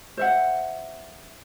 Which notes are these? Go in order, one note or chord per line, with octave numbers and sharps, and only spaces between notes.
C5 E5 F#5